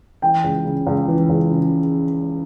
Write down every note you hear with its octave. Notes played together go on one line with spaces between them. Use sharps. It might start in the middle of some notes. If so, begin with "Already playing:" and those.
E3 G5
C#2
C#3
C#2
E3
C#2
C#3